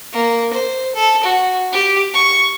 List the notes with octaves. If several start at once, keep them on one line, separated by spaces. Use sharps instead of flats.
A#3
C5
A4
F#4
G4
C#6